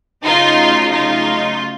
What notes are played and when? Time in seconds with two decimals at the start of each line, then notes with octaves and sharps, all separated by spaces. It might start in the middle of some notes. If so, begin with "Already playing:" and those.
0.23 C#3 F#3 A3 D#4 F4
0.91 D#4 F4